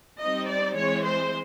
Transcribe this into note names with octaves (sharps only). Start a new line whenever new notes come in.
G3 C4 D#4 D#5
D5
E3 G#3 C4 C#5
C5